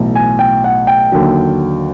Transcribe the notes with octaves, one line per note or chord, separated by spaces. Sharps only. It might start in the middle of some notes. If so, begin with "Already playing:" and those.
Already playing: B1 A2 E3
G#5
G5
F#5
G5
D#2 D3 F#3